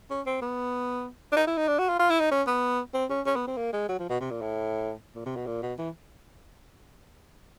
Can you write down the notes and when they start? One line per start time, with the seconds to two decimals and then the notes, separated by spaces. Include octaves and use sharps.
0.10 C#4
0.26 C4
0.42 B3
1.32 D4
1.36 D#4
1.47 E4
1.57 D#4
1.68 D4
1.78 F#4
1.89 F4
1.99 F4
2.10 E4
2.20 D#4
2.31 C#4
2.47 B3
2.94 C4
3.10 C#4
3.26 C#4
3.36 B3
3.47 C4
3.57 A#3
3.73 G#3
3.88 F#3
3.99 F3
4.09 B2
4.20 C3
4.31 A#2
4.41 A2
5.15 A#2
5.26 C3
5.36 B2
5.46 A#2
5.62 B2
5.78 E3